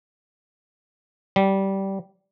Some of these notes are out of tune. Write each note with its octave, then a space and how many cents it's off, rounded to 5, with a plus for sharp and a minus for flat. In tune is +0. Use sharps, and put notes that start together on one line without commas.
G3 -15